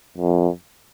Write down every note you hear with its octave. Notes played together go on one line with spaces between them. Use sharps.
F2